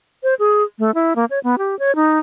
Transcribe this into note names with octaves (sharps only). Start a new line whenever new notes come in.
C5
G#4
A3
E4
A#3
C#5
B3
G4
C#5
D#4